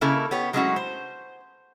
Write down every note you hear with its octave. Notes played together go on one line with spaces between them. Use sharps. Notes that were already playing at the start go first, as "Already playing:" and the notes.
C#3 A#3 E4 A4 A#4
B3 G4 C#5
F#3 G#3 A3 C#4 E4 F#4
C5